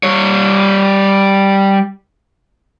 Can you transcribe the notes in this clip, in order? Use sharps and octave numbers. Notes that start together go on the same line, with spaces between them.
G3 C#5